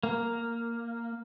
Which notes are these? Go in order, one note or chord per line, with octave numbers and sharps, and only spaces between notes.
A#3